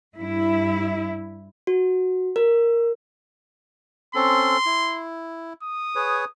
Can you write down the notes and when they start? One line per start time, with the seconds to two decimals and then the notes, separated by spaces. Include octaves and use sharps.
0.18 G2 E4
1.67 F#4
2.36 A#4
4.15 C4 C#4 A4 C6
4.66 E4
5.63 D#6
5.95 G#4 B4 C#5